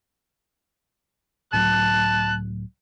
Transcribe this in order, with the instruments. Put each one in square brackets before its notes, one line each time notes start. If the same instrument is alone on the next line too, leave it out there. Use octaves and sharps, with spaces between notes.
[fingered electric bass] C#2 A2 F#3 [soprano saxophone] A5 [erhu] F#6